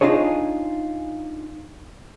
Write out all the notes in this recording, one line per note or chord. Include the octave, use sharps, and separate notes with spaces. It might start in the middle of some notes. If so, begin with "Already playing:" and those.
D4 D#4 F4 G#4 C#5